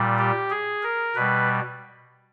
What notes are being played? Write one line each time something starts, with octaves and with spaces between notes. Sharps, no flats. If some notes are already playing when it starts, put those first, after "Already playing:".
Already playing: A#2 G3
G4
G#4
A#4
B2 G3 B4